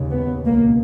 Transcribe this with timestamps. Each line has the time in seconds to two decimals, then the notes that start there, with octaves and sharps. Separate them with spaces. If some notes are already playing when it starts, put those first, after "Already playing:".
Already playing: D#2 C#3
0.10 B3
0.44 C#2 B2 A#3